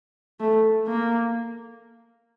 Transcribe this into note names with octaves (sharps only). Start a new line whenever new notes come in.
A3
A#3